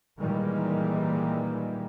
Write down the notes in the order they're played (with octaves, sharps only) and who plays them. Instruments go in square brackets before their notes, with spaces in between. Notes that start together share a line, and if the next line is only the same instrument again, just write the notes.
[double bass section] A#2 D#3 E3 G3 G#3